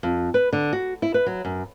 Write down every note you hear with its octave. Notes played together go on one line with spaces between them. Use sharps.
F2
B4
D3
F#4
E4
B4
F#3
F#2